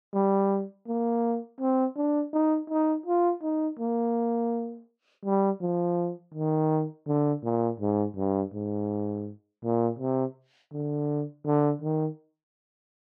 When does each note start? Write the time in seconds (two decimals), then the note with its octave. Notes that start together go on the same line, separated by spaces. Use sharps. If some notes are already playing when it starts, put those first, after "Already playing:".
0.14 G3
0.87 A#3
1.60 C4
1.96 D4
2.33 D#4
2.70 D#4
3.06 F4
3.43 D#4
3.79 A#3
5.25 G3
5.61 F3
6.34 D#3
7.08 D3
7.44 A#2
7.80 G#2
8.17 G2
8.54 G#2
9.64 A#2
9.99 C3
10.73 D3
11.46 D3
11.82 D#3